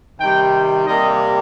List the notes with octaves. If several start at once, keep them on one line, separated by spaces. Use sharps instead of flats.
C3 D#3 G3 G5
C3 G3 A#3 D#5